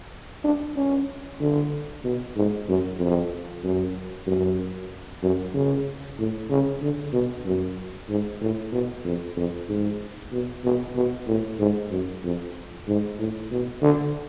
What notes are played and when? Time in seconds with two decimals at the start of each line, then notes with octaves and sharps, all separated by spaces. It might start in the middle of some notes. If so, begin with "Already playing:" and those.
0.44 D4
0.76 C#4
1.40 D3
2.04 B2
2.36 G#2
2.68 F#2
2.99 F2
3.64 F#2
4.27 F#2
5.23 F#2
5.54 C#3
6.19 A2
6.50 C#3
6.82 D3
7.13 B2
7.45 F#2
8.09 G#2
8.41 A2
8.72 B2
9.05 F2
9.37 F2
9.69 G#2
10.32 B2
10.64 B2
10.96 B2
11.27 A2
11.59 G#2
11.91 F#2
12.24 F2
12.88 G#2
13.18 A2
13.51 B2
13.82 D3